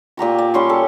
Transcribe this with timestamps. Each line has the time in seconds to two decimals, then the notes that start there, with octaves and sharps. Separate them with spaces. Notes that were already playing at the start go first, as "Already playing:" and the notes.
0.17 A#2 G4 A#5 C#6
0.38 D5
0.54 G3 C#4 C6 C#6
0.70 A4